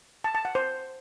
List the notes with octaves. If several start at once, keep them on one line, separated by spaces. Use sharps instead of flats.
A5
A5
F#5
C5